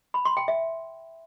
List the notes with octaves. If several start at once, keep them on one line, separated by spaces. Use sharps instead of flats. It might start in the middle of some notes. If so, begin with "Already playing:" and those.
B5
C6
G5
E5